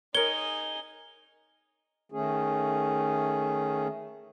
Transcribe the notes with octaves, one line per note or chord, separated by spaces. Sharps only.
D#4 G#4 A#4 C#5 G7
D#3 A3 C#4 G#4